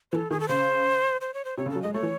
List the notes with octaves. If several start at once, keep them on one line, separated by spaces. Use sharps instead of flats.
E3 A4 C5
D#3 G#4
A4
C#3 C5
C5
C#5
C5
C3 C#5
C#3
A4
F#3
G#3 D#5
A3 C#5
E3